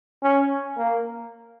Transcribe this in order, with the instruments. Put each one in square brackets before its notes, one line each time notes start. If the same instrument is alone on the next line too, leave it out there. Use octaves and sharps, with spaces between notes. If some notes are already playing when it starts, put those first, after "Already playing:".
[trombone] C#4
A#3